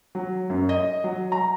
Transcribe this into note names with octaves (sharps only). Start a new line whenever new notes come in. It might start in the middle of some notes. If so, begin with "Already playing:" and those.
F#3
F#2
D#5
F#3
A#5